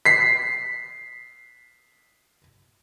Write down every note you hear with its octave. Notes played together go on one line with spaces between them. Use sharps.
B6 C7